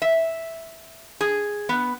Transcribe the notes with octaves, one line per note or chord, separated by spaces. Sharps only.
E5
G#4
B3